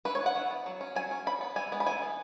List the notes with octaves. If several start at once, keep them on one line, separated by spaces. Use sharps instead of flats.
E3 B4
C#5
B3 F#5
E3
B3
F#3
C#4
F#3 G#5
C#4
F#3 B5
B3
E3 G#5
G#3 B3
B5
E3 G#5
B3